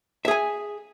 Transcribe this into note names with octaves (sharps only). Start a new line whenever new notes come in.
G#4 E5 G#5